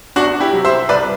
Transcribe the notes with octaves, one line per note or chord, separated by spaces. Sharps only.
E2 D4 F#4
E4 G4
C3 F#3
C5 E5
C2 B4 D5